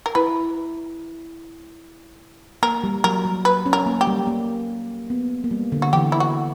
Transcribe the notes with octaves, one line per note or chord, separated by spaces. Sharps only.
A#4
E4 B4
A#3 A#4
G3
F#3 A#4
G3
B4
C#4
A#4
A#3
G4
G3
A#3
B3
A#3
G3
D3
F#4
E3 G4
E4
F#4